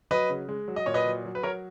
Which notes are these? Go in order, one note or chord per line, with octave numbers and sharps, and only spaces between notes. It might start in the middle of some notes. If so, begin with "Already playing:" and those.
F#3 B4 D#5
C#3
G#3
F#3
D#5
A#2 C#5
B4 D#5
F#3
F#3
B4
F#3 A#4 C#5